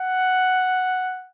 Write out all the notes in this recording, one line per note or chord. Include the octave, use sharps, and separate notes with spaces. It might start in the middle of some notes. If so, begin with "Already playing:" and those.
Already playing: F#5